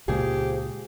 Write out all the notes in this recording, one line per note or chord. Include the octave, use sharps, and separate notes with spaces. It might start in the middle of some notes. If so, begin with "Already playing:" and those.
C#2 A#2 F3 G4 G#4